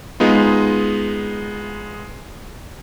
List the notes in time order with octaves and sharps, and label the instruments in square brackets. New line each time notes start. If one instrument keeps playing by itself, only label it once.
[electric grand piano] G#3 B3 D#4 F4